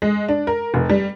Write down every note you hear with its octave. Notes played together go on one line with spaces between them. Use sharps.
G#3
D4
A#4
F1
G3